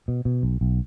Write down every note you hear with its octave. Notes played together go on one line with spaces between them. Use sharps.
B2
B2
B1
B1